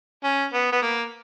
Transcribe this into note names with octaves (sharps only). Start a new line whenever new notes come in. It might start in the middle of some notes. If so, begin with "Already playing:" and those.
C#4
B3
B3
A#3